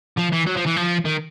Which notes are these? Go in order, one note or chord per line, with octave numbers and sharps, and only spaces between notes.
F3
E3
F#3
F3
E3
F3
D#3